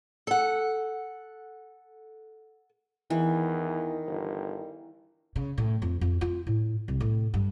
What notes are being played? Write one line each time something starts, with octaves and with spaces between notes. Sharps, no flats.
A4 F#5
E2 D#3 E3
G1
C#3
A2
F2
F2
F4
A2
C2
A2
G2